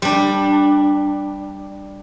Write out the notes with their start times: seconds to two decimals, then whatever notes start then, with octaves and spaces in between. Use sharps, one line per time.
0.02 G3 D4